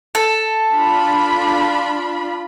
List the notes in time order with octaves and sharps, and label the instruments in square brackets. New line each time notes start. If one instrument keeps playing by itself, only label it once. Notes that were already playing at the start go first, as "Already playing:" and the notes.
[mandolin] A4
[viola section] D4 F4 B5